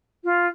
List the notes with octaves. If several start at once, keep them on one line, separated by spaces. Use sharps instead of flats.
F4